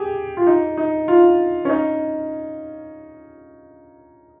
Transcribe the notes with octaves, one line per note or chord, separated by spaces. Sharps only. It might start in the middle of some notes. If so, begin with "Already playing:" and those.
Already playing: G4 G#4
F4
D#4
D#4
F4
C#4
D#4